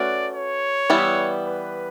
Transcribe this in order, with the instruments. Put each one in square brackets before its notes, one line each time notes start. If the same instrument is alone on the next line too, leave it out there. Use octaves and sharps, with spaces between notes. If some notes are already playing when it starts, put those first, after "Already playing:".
Already playing: [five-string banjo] A3 C#4 F#4 B4 [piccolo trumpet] D5
[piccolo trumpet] C#5
[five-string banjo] E3 G3 B3 E4
[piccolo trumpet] B4